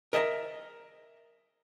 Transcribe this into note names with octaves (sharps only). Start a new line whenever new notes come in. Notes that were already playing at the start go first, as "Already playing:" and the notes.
A#4 D#5 E5 G#5 A#5